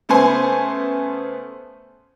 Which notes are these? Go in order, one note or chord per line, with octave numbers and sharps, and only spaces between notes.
C#3 A3 B3 C5 G#5 C6